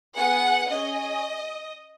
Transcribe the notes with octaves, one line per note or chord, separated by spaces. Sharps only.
B3 G#4 F#5
C#4 G#4 D#5